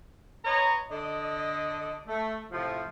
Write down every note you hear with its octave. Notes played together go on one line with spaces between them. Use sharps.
B4 C#5 D#5 A#5
D3 A4 D5 D#5
A3
A2 C3 F3